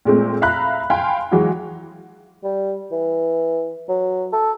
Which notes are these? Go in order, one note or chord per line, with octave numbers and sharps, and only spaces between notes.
A#2 G#3 A3 C4
E5 F5 A#5 B5 F#6
F5 G5 G#5 B5 C6
E3 F#3 G#3 F#4 G#4
G3
E3
F#3
A4